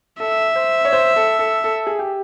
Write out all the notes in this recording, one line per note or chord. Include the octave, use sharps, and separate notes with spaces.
A4 E5
C5
C#5
C5
A4
A4
A4
G#4
G4